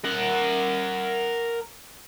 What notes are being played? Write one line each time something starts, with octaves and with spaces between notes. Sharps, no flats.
A#4 F#5